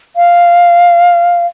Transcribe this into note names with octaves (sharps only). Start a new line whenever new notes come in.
F5